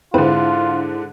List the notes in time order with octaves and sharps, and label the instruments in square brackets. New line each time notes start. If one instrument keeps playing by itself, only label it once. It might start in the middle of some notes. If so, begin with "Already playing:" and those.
[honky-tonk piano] G#2 D3 [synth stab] C4 B4 [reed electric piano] E4 C5 [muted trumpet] F4